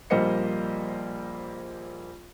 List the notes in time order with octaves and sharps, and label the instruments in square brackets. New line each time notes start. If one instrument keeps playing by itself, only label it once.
[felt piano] A#1 G3 A#3 C5 D#5 C#7